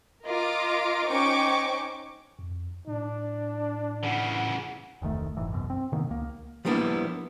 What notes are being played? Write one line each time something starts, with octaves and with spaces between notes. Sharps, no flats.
F4 A#4 D#5 D6
C#4 D#4 C5 G5 C#6 D6
F2
A2 D4
C#3 E3 F#5
F1 D2 D#3 A3
F#1 G#2 E3
C2 F#2 B2
C4
C3 D#3 A#3 B3
C#2 A#3
F3 G3 A#3 B3 D4 E4